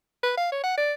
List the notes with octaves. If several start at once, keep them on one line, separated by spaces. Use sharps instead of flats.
B4
F5
C#5
F#5
D5